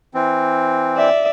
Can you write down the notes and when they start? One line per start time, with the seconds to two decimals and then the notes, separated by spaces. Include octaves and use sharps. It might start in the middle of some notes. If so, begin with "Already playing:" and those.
0.14 E3 C4
0.97 D5 E5